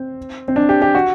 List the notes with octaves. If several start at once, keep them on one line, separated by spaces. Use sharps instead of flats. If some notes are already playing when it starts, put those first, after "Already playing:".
Already playing: C4
C4
D4
G4
G4
F#4